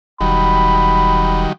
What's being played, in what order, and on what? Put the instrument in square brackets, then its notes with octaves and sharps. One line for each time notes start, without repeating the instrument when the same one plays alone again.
[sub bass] E1 [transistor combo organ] D#3 F#3 G3 [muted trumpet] B5